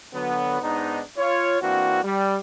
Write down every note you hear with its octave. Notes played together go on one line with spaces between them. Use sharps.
D3 F#3 B3
G#2 B3 D4 D#4
F4 C#5
E3 A#3 C4 D4 F#4
G3